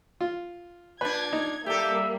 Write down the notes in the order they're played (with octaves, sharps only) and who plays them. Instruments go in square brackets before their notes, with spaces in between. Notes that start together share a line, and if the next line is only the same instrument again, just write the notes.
[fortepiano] F4
[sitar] A#2 D4 [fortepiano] B4 [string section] G#6
[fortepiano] D#4
[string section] G3 A#3 [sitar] G4 A4 [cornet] E5